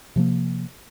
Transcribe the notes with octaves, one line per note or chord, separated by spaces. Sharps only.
C3 F3 A#3